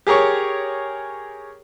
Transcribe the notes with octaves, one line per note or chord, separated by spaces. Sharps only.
G4 G#4 A#4 C#5 C#6